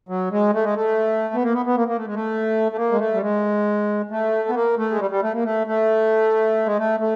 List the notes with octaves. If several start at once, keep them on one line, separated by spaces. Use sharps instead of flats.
F#3
G#3
A3
G#3
A3
B3
A#3
B3
B3
A#3
A#3
A3
G#3
A3
A3
A#3
G#3
A3
G3
G#3
A3
B3
A#3
A3
G#3
G3
G3
A3
A#3
A3
A3
G#3
A3
A3